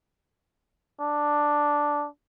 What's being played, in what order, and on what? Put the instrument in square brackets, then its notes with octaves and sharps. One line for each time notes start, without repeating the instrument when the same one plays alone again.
[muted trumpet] D4